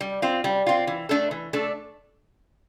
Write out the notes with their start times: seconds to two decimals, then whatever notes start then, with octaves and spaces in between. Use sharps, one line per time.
0.01 G3
0.22 C4 F4
0.44 G3
0.66 C4 F4
0.87 E3
1.09 A3 D4 A4
1.31 E3
1.53 A3 D4 A4